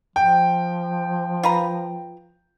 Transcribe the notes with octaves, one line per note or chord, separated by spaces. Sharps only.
F3 G5
F4 B4 A#5